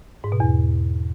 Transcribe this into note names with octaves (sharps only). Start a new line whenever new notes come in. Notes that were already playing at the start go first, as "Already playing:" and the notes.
G#2
B2
E2